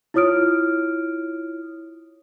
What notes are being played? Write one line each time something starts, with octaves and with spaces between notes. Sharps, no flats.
E4 F4 C#5 D#6 F6 D7